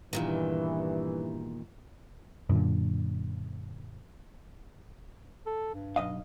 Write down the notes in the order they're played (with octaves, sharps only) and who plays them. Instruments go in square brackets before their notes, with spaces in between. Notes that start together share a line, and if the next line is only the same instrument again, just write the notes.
[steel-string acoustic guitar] E2 A#2 D#3 [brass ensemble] G2 E3
[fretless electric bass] F#2 A#2 D3
[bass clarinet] A4
G2
[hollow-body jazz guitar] B1 D#5 F5